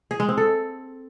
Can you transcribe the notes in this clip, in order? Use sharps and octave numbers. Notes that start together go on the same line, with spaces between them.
G#4
G#3
C4
A4